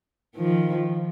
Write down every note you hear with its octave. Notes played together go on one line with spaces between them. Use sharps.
D#3 F3